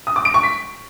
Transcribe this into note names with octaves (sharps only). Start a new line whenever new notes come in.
D#6
D6
D7
C#6
B6